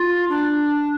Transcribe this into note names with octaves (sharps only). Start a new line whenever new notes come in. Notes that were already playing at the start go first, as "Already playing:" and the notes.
Already playing: F4
D4